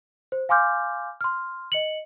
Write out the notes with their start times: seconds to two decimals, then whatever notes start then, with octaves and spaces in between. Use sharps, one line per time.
0.32 C5
0.49 F5 G#5 C6 D6 F6 G6
1.21 C6 F6
1.72 D#5 C#7 F#7